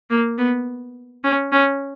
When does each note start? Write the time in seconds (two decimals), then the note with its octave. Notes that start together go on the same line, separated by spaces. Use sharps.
0.10 A#3
0.38 B3
1.24 C#4
1.52 C#4